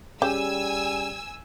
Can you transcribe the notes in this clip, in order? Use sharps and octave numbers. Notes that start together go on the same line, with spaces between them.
G3 C#4 G4 G#4 G#5 E6